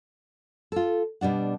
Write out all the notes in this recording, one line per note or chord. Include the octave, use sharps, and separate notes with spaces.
F4 A4
B2 G3 D4 F#5